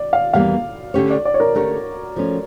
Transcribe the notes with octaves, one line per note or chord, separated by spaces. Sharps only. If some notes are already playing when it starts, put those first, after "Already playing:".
Already playing: D5
F5
E2 E3 G3 A#3 F5
D3 A3 C#4 G4 C#5
D5
D5
C#5
A#4
D3 A3 C#4 G4 A#4 C#5
F3 A3 C#4